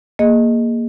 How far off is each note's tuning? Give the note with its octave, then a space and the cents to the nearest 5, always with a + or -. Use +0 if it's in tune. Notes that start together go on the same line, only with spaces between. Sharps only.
A#3 +0 G#4 -5 D#5 +0